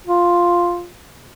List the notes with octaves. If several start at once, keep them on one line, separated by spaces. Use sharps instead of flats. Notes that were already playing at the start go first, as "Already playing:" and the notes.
F4